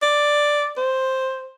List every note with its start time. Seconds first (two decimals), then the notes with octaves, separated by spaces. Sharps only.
0.02 D5
0.77 C5